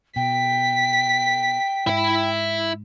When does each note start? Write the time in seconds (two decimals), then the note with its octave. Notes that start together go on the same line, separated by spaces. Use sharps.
0.16 B2 G5 B6
1.87 G#2 E4 E5